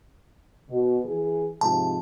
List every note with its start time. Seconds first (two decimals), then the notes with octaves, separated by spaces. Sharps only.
0.70 B2
1.05 E3 G#4
1.61 G#2 C3 F3 A5